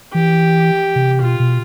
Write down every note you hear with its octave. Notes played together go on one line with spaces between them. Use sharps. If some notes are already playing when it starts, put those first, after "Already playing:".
E3 G4
C3
B2 F4
B2